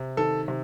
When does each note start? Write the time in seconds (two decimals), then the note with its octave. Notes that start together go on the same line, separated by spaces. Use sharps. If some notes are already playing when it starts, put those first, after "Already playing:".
Already playing: C3
0.17 D#3 A4
0.48 C3